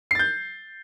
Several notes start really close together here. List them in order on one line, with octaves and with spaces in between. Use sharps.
C7 A6 G6